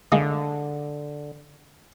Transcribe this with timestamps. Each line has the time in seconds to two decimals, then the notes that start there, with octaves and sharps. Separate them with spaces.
0.12 D3 G#3 A#3 D#4